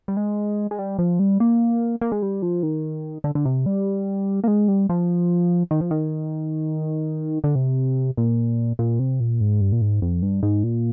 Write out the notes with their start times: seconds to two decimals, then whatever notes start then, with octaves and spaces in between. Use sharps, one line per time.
0.08 G3
0.17 G#3
0.71 G#3
0.79 G3
0.99 F3
1.19 G3
1.40 A#3
2.01 A#3
2.12 G#3
2.22 G3
2.42 F3
2.63 D#3
3.24 D3
3.35 D3
3.45 C3
3.66 G3
4.44 A#3
4.48 G#3
4.68 G3
4.89 F3
5.71 D#3
5.81 F3
5.91 D#3
7.44 D3
7.55 C3
8.17 A#2
8.79 A#2
8.99 C3
9.20 A#2
9.41 G#2
9.61 G2
9.72 A#2
9.82 G#2
10.02 F2
10.22 G2
10.43 G#2
10.64 A#2